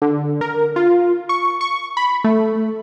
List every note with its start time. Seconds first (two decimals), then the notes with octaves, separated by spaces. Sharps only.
0.02 D3
0.41 A#4
0.76 F4
1.29 C#6
1.61 C#6
1.97 B5
2.24 A3